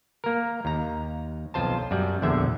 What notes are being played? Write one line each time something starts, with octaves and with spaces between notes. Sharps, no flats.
A#3 A#4
D#2 A#5
B1 F2 F4 C5 A5
F#2 G3 D5
A#1 E2 D3 E5